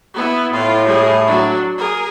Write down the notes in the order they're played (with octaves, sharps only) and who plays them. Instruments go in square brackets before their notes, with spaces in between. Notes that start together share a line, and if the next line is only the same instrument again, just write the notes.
[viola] B3 E4
[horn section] A2 [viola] F4
[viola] G3 G#4
F#3 D4
G#4 A#4